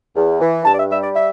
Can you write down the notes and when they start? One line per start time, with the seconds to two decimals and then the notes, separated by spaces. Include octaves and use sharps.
0.16 E2
0.41 E3
0.65 G2 A5
0.73 D5
0.78 E5
0.90 G3 E5
1.03 D5
1.15 E5